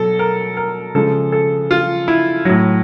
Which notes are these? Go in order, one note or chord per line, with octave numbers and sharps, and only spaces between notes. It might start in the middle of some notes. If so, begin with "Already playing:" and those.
Already playing: B2 F#3 A4
A#4
A#4
C#3 F3 G#3 A4
A4
F4
E4
A2 F#3